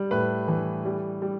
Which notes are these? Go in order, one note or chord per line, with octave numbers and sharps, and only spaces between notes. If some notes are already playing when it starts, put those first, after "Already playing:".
Already playing: G3
A2 B4
E3
G3
G3